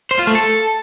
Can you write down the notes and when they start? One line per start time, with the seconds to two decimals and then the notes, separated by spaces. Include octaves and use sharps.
0.11 C5
0.19 F4
0.27 A3
0.35 A4